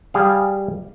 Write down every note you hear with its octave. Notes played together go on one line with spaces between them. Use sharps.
G3 G#4 F5